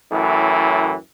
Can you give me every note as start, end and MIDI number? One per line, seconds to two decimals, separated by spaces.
0.12 0.94 42
0.12 0.94 45
0.12 0.94 52